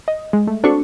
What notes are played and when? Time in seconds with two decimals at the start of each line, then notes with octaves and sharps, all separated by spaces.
0.08 D#5
0.33 G#3
0.47 A3
0.63 C4 D4 F#4 A4 C#6